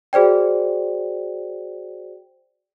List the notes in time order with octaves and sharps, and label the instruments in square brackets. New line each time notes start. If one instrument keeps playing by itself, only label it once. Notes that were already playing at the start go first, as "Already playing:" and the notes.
[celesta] F#4 G#4 C5 D5 G5